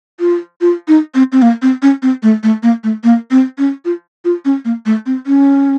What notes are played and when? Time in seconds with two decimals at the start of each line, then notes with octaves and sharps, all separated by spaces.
0.20 F4
0.61 F4
0.88 D#4
1.15 C4
1.32 C4
1.42 A#3
1.62 C4
1.82 C#4
2.02 C4
2.23 A3
2.43 A3
2.63 A#3
2.84 A3
3.04 A#3
3.31 C4
3.58 C#4
3.85 F4
4.25 F4
4.45 C#4
4.65 A#3
4.86 A3
5.06 C4
5.27 C#4